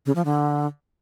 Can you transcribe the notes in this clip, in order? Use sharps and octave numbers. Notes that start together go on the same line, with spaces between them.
C#3
F3
D3